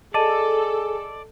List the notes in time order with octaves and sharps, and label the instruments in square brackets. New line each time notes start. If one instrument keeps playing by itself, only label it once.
[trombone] G#4 [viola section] A4 [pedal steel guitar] D5 [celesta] D#5 A5 D#7